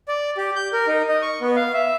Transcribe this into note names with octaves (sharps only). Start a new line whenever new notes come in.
D5
G4
G6
A#4
D#4
D#5
C#6
B3
F5
E5